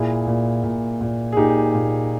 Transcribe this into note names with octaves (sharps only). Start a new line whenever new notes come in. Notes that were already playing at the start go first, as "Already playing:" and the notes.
Already playing: A#2 E4 G#4
A#2
A#2
A#2
G#4
A#2 D#4 G4
A#2